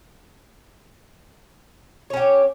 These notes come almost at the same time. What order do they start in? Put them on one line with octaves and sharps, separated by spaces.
C#5 C#4 G4